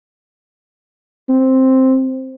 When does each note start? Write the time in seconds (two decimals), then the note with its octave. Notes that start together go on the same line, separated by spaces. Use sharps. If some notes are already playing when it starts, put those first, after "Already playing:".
1.29 C4